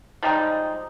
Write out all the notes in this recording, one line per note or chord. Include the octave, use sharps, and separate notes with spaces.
F3 G3 G#3 D#4